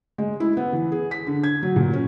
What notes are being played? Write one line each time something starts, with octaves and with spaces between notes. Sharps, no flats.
G#3
E4
B3
E3
G#4
B6
D3
G#6
F#3
A#2
C#4